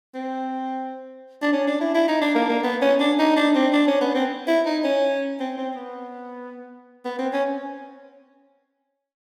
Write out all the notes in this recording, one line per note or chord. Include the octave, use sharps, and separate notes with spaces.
C4
D4
C#4
D4
E4
E4
D#4
D4
A#3
A#3
B3
C#4
D4
D#4
D4
C4
D4
C#4
B3
C4
E4
D#4
C#4
C4
C4
B3
B3
C4
C#4